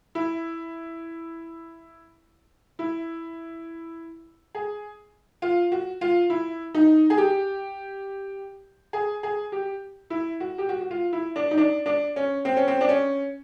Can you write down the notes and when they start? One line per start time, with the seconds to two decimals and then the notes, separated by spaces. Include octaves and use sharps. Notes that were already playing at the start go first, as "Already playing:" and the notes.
0.15 E4
2.79 E4
4.55 G#4
5.42 F4
5.72 F#4
6.01 F4
6.30 E4
6.75 D#4
7.10 G#4
7.17 G4
8.93 G#4
9.23 G#4
9.52 G4
10.10 E4
10.40 F#4
10.58 G4
10.69 F#4
10.81 F#4
10.91 F4
11.13 E4
11.36 D4
11.51 D#4
11.58 D4
11.86 D4
12.16 C#4
12.45 C4
12.57 C#4
12.68 C4
12.81 D4
12.89 C#4